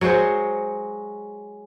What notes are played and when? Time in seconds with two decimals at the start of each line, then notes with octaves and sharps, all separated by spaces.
0.01 F#3 G#3 F#4 C5